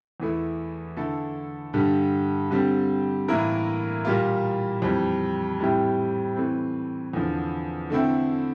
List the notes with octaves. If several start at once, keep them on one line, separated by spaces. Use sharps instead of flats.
E2 E3 A3 E4
D3 A3 E4 A4
G2 D3 G3
D3 G3 C4
A2 E3 A#3 E4 A#4
A#2 G3 A#3 F4
F2 E3 G3 C4
A2 G3 C4 E4 G4
E3 A3 C4
E2 D3 F3
D3 A3 C4 E4